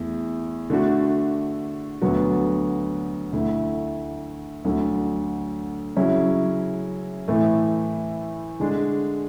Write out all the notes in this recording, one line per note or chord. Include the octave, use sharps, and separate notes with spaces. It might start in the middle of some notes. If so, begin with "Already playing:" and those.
Already playing: E2 A3
D3 A3 D4 F#4
D2 D3 F#3 B3 F#4
D2 D3 A3 E4
D2 D3 F#3
C#3 F#3 C#4 E4
A2 E3 A3
D3 G#3 D4